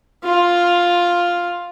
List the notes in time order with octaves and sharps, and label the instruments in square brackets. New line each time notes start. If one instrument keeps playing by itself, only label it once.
[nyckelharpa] F4